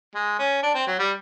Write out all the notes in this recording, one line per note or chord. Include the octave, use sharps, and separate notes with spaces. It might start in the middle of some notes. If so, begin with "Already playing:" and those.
G#3
C#4
D4
C4
F#3
G3